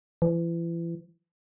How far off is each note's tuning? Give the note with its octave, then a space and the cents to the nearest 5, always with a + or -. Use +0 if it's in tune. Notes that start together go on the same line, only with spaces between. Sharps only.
E3 +35